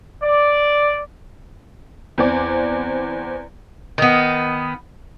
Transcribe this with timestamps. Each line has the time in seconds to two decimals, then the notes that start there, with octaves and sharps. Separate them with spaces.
0.23 D5
2.18 E2 C4 D5
3.98 D#3 B3